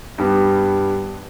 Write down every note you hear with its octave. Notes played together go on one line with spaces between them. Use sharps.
G2 G3 B3